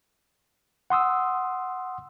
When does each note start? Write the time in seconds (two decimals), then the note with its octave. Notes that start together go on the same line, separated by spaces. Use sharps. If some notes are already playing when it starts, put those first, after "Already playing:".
0.90 F#5 C6 D#6 E6